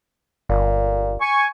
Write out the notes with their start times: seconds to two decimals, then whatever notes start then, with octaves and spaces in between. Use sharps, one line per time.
0.49 G1 A#2
1.21 G#5 C#6